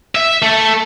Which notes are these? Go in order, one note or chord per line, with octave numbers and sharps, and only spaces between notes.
E5
A3